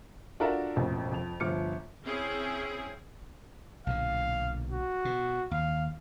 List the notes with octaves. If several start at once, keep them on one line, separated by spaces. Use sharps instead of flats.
D4 F4 F#4 A4 A#4 E5
E1 A1 F2
F2 F7
G1 F3 D6 F6 C#7
C4 C#4 E4 G#4
B1 A#2 D3 F5
F#4
B2
D#2 F5